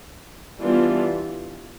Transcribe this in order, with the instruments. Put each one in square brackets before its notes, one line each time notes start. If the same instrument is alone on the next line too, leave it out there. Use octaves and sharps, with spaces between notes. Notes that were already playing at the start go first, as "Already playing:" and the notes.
[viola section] E3 G3 B3 D4 F4